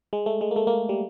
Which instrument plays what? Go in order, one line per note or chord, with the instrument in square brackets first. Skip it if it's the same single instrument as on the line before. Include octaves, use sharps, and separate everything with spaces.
[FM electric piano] G#3
A3
G#3
A#3
A3
A#3
G3